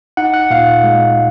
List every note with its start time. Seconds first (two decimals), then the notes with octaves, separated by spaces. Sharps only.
0.17 D#4 F#5
0.34 F#5
0.51 A#2 F5
0.84 G#3